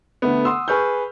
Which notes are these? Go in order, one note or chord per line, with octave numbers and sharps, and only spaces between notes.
D3 A3 B3
F#5 C6 D#6 E6
G#4 B4 C#6 F6 G6